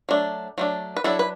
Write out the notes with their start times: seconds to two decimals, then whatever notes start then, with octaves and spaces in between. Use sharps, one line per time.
0.09 F#3 A3 D4
0.58 F#3 A3 D4
0.97 B4
1.04 F#3 D4 E4 A4
1.19 B4